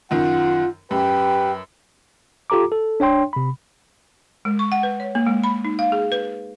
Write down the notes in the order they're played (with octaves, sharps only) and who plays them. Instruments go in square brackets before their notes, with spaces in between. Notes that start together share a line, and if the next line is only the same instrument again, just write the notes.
[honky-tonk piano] F#2 D#3 [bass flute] F4 [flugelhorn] F#5
[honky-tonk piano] F#2 [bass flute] G4 [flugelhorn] B4 [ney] G5
[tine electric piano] F4 G4 A4 A#5 D6
A4
D4 C#5 G5 C6
C3 B5
[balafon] G#3
C#6
F#5
B4
C#5
A#3
G#3
B5
D#4
F5
G#4
B4